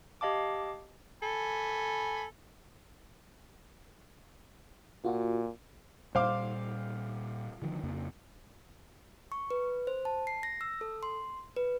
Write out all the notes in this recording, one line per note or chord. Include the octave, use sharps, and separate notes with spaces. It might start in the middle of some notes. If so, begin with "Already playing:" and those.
G4 D#5 F5 A5 D6
A4 G#5 B5
A#2 F4 F#4
A#2 G3 C5 F5 D6
D3 D#3 F3
F2 C#3 A#3
C#6
B4
C5
A5
C7
A#6
E6
A4
C6
B4